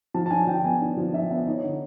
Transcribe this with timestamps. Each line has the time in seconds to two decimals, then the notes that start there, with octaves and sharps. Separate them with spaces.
0.14 F3 A5
0.26 A5
0.30 D4 G#5
0.47 F3 G5
0.64 B3 G#5
0.81 D4
0.97 F3
1.13 D4 E5
1.31 B3
1.47 D#4 C#5
1.64 D3